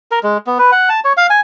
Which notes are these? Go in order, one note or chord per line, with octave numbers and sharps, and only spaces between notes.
A#4
G#3
B3
B4
F#5
A5
C#5
F5
G#5